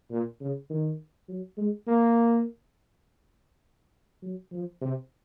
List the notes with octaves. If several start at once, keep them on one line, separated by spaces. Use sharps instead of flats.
A#2
C#3
D#3
F#3
G#3
A#3
F#3
F3
C3